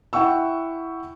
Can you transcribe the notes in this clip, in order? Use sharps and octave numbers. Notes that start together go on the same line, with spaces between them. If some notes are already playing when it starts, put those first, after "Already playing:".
E4 F#5 G5 C#6 E6